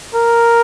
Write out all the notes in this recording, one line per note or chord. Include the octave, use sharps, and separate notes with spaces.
A#4